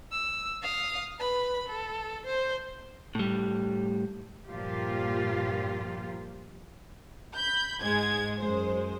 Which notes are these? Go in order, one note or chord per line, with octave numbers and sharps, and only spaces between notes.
E6
F5 D#6
B4 B5
A4
C5
A2 G3
G2 A#2 F3 F4 G4
B5 G6
G#2 G#3 G#6
F#2 G#3 C5